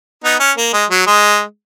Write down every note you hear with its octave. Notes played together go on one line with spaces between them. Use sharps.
B3 D#4
C#4
A#3
G#3
F#3
G#3